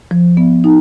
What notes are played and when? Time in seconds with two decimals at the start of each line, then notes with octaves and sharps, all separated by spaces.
0.11 F3
0.37 B3
0.64 D#4